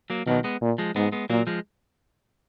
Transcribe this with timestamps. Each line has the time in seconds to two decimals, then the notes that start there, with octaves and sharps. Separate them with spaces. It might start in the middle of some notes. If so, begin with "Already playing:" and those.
0.10 F#3 A#3
0.27 B2 D#3 F#3
0.44 G#3 B3
0.61 A#2
0.78 F3 G#3
0.96 G#2 G#3 B3
1.12 G#3 B3
1.30 A#2 F#3 A#3
1.47 F3 G#3